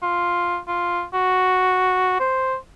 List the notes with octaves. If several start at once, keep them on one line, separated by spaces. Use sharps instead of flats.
F4
F4
F#4
C5